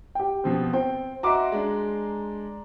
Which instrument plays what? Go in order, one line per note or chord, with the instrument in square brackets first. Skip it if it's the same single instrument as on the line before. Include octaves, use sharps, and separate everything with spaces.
[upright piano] G4 G5
[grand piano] B2 F3 C4
[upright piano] C4 [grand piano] G5
[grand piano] F#4 D#5 E5 [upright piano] A#5 C6 D6
[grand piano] G#3 D4